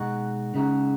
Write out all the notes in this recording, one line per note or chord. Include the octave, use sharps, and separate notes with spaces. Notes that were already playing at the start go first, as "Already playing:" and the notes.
Already playing: B2 G#3 D#4 F#4
C#3 G#3 D#4 F#4